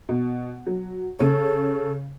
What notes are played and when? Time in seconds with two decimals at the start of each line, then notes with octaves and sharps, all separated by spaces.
0.09 B2
0.67 F#3
1.19 C#3 A4 C#5